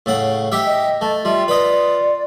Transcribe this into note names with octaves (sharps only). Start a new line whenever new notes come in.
A2 C#3 F#5
D#4 G4 E5
D#5
A3 A5
G3 F4 E5
B4 D5 D#5